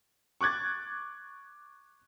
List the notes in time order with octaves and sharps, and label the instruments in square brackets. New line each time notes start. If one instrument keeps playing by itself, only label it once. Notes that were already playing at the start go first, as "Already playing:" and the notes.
[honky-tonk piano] C#6 D6 F#6 G#6 A6